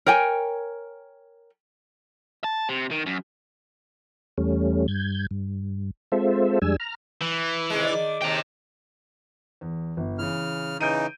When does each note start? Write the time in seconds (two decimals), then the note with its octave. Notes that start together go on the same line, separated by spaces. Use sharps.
0.06 A#4 C#5 G5 G#5
2.44 A5
2.69 C3
2.91 D#3
3.06 F#2
4.38 E2 G3 A3 C#4
4.88 G2 G6 G#6
5.31 G2
6.12 G#3 C4 F4 A4 C5 E5
6.62 F2 G3 G#3 D4 G#5 E6
6.80 A#5 F6
7.22 E3
7.70 C3 D#3 G#3
7.86 D#3 D5
8.22 D#2 C3 G5 A#5
9.61 E2
9.97 G1
10.19 C#3 E3 F6
10.81 C#3 E3 D#4 G6 D7 D#7